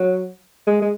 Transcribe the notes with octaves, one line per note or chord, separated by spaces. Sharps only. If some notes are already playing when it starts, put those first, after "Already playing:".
Already playing: F#3
G#3
G#3